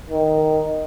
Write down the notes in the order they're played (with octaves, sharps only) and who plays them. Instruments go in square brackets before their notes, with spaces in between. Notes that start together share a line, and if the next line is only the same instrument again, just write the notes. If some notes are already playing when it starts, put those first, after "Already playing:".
[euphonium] D#3